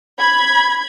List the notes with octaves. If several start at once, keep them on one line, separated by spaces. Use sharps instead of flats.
B5 G#6